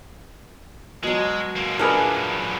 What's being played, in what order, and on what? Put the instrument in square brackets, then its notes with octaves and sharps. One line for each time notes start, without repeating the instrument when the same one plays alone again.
[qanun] B2 F#3 [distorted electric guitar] G#3
[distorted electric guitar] G#3 A#3
[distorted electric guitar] A#2 F#3 [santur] D4 G#4 B4 [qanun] A#4 E5 B5